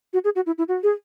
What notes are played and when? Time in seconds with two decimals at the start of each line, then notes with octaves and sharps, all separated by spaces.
0.13 F#4
0.24 G#4
0.36 F#4
0.46 E4
0.58 E4
0.68 F#4
0.83 G#4